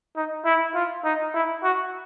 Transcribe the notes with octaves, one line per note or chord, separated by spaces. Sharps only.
D#4
E4
F4
D#4
E4
F#4